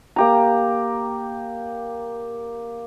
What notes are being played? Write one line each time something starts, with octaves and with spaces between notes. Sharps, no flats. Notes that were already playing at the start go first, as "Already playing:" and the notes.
A#3 G4 A#5